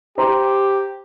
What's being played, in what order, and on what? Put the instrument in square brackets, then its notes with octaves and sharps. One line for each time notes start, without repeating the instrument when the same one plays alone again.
[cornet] G4 [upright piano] C5 A#5 C6